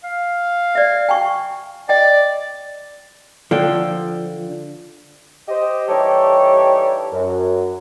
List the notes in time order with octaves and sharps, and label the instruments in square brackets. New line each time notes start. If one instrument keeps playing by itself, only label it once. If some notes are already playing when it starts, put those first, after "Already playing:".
[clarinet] F5
[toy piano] D5 E5
G5 G#5 C#6
[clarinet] D5 [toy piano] D#5 G5
[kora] D3 G5 [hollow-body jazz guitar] F3
[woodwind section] G4 C5 D#5
E3 G3 D#4 G4 A4 C#5
F#2